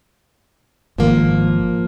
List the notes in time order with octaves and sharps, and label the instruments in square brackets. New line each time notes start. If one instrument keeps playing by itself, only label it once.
[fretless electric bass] G#1 [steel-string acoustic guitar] F3 A#3